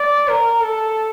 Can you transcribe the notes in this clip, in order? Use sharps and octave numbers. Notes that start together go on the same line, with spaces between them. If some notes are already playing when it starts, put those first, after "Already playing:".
Already playing: D5
A#4
A4